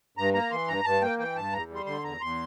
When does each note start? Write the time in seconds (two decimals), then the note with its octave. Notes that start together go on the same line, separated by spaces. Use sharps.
0.17 G2 A#5
0.34 A#3 A#5
0.51 E3 C6
0.68 G2 A#5
0.84 G2 A5
1.02 A#3 G5
1.19 E3 G5
1.36 G2 A5
1.52 E2 A#5
1.70 G3
1.75 C6
1.86 D3 C6
2.03 E2 A#5
2.21 E2 C6